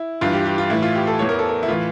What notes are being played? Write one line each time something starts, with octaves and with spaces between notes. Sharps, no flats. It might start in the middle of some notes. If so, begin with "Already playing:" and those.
Already playing: E4
G2 E3 F4
G4
G4
F4
A2 E3 E4
F4
G4
A4
E2 E3 C#5
A#4
A4
A#4
E4
A2 E3 F4